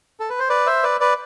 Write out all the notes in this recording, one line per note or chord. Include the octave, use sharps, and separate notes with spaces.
A4
B4
C5
B4 D5
C5 E5
B4 D5
B4 D5